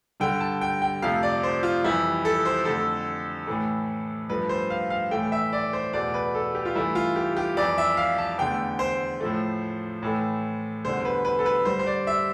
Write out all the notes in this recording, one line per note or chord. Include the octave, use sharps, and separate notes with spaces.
G2 D3 G3 G5
A5
G5
G5
F2 C3 F3 A3 F5
D5
C5
F4
F2 E3 G3 E4
A4
C5
F2 D3 A3 A4
A2 E3 A3
G2 F3 A3 B4
C5
F5
F5
A2 E3 A3 G5
E5
D5
C5
E2 B2 A3 D5
B4
A4
G4
F4
G2 E3 A3 E4
F4
G4
G4
F2 E3 G3 D5
E5
F5
A5
E2 D3 A3 G5
C5
A2 F3 A3
A2 E3 A3
E2 D3 G3 C5
B4
B4
A4
B4
G2 D3 G3 C5
C5
D5
E5